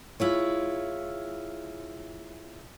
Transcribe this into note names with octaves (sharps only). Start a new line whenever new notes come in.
G#3 E4 F4 C#5